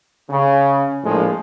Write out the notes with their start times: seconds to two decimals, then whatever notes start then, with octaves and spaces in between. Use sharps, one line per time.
0.30 C#3
1.04 A#1 A2 F3 G#3